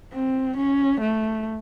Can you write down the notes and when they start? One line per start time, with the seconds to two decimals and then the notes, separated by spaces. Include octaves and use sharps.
0.13 C4
0.57 C#4
1.01 A3